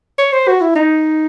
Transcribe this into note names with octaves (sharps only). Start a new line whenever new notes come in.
C#5
C5
F#4
E4
D#4